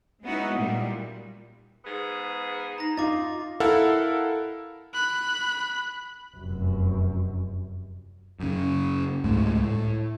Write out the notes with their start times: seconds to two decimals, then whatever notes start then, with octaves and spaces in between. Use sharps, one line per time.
0.23 G#3 B3 C#4 D#4 E4 F#4
0.54 A#2 G3
1.85 G#2 B3 G#4
2.78 D#4 A#5 A#6
2.97 D#4 F4 F5 D6 A6
3.60 E4 A4 A#4 F5 F#5
4.94 B5 F#6
6.37 F1 F#2
8.40 F#2 C#3
9.24 C#2 G#2 G#3 A3
9.57 A2